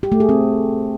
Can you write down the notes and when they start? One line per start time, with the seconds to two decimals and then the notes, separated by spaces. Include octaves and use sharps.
0.03 G4
0.12 A3
0.20 G#4
0.29 C4